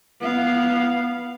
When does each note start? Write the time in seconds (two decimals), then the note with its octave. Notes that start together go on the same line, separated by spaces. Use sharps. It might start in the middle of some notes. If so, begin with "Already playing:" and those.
0.20 B3 F5